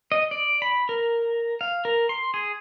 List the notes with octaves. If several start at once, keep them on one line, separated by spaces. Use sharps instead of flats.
D#5
D5
B5
A#4
F5
A#4
C6
G#4